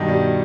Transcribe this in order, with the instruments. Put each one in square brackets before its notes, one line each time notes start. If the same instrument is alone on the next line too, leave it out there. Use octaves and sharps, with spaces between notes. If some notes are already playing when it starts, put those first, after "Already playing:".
Already playing: [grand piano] G2 B2 D#3 D#5
G3